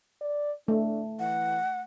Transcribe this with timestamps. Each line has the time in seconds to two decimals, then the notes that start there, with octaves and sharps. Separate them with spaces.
0.21 D5
0.68 A3 D4
1.19 E3 F#5